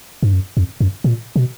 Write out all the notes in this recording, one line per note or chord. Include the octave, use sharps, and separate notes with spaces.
G2
F#2
F2
F#2
A#2
B2